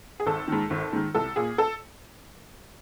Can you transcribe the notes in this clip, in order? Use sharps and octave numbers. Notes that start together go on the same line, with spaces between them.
G#4
G#1 A4
G#2 D#3
G#1
G#2 D#3
C2 A4
A#2 G#4
A4